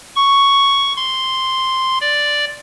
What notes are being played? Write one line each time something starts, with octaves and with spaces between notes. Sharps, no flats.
C#6
C6
D5